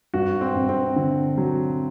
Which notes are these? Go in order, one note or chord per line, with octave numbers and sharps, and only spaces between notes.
G2 F#4
C4
G2
C4
D3
F#3